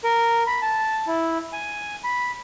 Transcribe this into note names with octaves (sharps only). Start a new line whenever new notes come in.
A#4
B5
A5
E4
G#5
B5